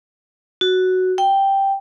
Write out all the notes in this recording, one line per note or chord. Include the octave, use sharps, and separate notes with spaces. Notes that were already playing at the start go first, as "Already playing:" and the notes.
F#4
G5